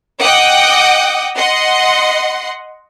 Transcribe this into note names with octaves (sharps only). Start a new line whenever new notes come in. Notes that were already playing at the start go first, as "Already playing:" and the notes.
D#5 F#5 G5 D6 D#6
D#5 F#5 C6